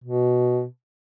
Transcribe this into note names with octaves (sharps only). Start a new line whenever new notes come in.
B2